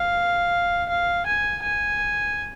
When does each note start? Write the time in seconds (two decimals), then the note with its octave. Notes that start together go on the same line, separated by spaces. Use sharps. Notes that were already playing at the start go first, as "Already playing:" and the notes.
Already playing: F5
0.89 F5
1.26 G#5
1.63 G#5